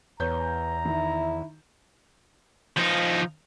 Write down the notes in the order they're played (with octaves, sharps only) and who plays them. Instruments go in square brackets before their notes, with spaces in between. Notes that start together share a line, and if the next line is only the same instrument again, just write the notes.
[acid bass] E2 [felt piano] B3 C#5 G6 [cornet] A#5
[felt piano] D#3 [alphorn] E4
[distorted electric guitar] F3 D#4